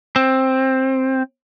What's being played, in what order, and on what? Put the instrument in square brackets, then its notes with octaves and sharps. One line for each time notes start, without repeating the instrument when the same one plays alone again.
[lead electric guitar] C4